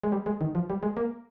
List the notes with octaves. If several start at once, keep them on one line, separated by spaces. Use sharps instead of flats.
G#3
G3
G#3
D#3
F3
G3
G#3
A#3